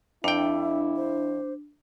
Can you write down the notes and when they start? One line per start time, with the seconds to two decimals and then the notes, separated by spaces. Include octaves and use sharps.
0.24 F2 D4 E4 E5 G5
0.96 C5